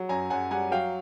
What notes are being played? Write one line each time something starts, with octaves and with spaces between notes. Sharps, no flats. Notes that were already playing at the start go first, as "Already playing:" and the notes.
Already playing: F#3
F#2 G#5 A#5
F#2 F#5 G#5
G3 F#5 G#5
F#3 F5 G5